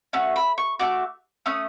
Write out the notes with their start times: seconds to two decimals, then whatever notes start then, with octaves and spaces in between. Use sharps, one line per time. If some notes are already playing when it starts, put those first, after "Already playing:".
0.13 A3 C#4 F#4
0.36 B5
0.58 C#6
0.79 A3 C#4 F#4 D6
1.46 A3 C#4 D#6